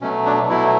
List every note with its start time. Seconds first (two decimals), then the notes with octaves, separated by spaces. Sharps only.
0.01 B2 F#3 A3 C#4
0.26 D4
0.49 B2 F#3 A3 E4